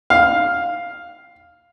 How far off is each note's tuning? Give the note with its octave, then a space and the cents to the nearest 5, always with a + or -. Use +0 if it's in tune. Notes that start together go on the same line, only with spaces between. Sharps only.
F5 +5